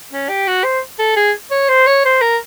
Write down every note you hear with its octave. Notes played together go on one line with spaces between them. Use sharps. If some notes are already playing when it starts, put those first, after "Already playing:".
C#4
G4
F#4
C5
A4
G#4
C#5
C5
C#5
C5
A#4